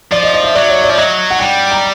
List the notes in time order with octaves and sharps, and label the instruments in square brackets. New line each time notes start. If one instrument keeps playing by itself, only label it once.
[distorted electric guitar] F3 [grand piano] D5
[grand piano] D#5
D#5
E5
[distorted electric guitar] F#3 [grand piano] D5
[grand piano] C#5
D5
[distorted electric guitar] F3
[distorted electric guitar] F#3 [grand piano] D#5
[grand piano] F#5
[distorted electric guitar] G3 [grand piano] G5
[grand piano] A#5